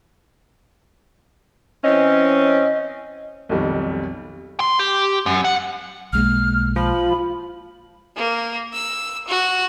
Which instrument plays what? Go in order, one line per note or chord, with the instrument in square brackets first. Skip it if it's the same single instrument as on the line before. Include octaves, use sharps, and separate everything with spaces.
[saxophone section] E3 C4 C#4 [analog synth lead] D#5
[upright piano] B1 F2 D#3 G3
[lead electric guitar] C6
G4
F#2
F#5
[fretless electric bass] B1 G#3 A#3 [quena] F6
[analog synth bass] F3 [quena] B5
[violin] A#3
E6
F#4